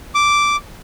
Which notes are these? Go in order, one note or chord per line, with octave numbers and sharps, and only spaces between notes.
D6